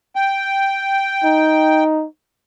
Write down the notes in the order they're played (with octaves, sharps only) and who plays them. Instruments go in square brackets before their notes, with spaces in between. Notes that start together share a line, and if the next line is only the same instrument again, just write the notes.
[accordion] G5
[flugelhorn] D#4